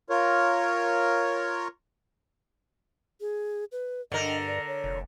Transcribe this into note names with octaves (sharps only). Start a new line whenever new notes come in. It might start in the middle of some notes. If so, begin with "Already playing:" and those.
F4 A#4 C#5
G#4
B4
G2 D3 A#4 D#5
D5
C#5
F1